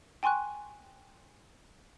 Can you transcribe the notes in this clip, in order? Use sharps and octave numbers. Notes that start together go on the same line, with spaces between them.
G5 G#5 C6 C#6 F#6